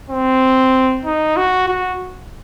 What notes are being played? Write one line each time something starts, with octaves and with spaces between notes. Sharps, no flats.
C4
D#4
F#4
F#4